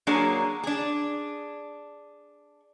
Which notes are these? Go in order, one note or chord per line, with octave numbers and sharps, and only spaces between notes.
F#3 A#3 D4 G#4 C#5
D4 G#4